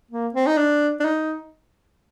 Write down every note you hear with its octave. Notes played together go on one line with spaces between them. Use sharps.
A#3
C4
D#4
D4
D4
D#4